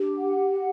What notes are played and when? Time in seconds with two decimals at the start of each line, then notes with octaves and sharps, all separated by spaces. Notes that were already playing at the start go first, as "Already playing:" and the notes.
Already playing: D4 G4
0.18 F#5